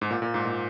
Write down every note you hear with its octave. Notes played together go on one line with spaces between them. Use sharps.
G#2
A#2
A#2
G#2
A#2